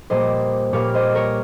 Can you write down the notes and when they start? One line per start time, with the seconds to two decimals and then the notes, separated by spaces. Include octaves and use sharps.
0.10 A#2 G3 A#3 C5 D#5
0.73 A#2 G3 A#3 C#5 F5
0.94 C5 D#5
1.15 A#4 C#5